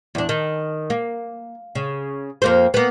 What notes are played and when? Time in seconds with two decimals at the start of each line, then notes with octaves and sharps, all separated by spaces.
0.15 E2 D4
0.29 D#3
0.90 A#3
1.75 C#3
2.42 F2 A#3 C5
2.74 A#3 B3